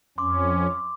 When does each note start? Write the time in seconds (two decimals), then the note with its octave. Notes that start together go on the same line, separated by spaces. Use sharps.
0.18 F2 C#4 C6 D6